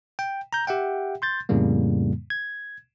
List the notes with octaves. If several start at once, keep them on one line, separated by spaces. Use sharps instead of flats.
G5
A#5 G6
G4 E5 F#5 G5
C6 G6 A6
F2 A2 C#3 G3 A#3
G#6